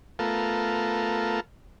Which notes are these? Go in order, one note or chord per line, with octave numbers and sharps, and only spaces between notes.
A3 B3 F4 A4 A#4